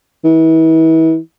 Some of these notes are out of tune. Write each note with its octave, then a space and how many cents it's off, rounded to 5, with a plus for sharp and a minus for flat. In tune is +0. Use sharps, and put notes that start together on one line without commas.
E3 -35